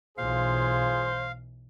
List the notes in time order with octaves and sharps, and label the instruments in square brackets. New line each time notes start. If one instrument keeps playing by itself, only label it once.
[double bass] B1 E3 [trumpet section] F4 G#4 [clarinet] C5 [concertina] F5